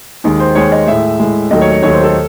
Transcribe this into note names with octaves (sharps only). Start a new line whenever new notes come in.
D#2 D#3 G#3
C5
D#2 D#3 G#3 C#5
D#5
A2 G#3 E5
A2 G#3
D#2 D#3 F#3 A3 D#5
C#5
C#5
D#2 D#3 F#3 A3 C#5
C5
A4